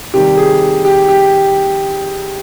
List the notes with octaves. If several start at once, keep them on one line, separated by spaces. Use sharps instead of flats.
C3 D#3 G3 G4
G#4
G4
G4